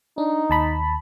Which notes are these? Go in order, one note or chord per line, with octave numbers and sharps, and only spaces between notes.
D4 D#4
D#2 A5 B5